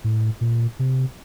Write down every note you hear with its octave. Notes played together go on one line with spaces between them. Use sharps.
A2
A#2
C3